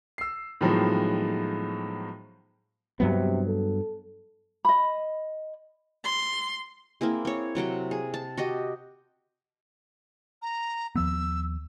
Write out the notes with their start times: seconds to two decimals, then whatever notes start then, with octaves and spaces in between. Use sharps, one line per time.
0.18 E6 C7
0.61 A2 D#3 F3 F#3 G#3 B3
3.00 G2 C3 F#3 B3
3.48 A4
4.65 D#5 B5
6.04 C6
7.01 A#3 C4 E4 G#4
7.25 C4 C#5
7.55 C3 F#3 F#5 G5
7.91 G#4
8.14 A5
8.37 F#4 G4 D#5
10.42 A#5
10.96 D#2 F3 B3 E6